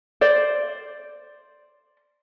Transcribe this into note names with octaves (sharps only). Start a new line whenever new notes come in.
C5 D5